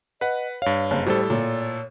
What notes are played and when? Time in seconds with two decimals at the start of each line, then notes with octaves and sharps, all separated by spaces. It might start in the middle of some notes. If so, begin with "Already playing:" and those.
0.21 B4 D#5 F#5
0.62 G2 C#5 F5
0.91 F#1
1.06 A2 G3 A4 C5
1.30 A#2 C#5